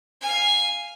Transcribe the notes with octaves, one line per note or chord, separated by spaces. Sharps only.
F5 G#5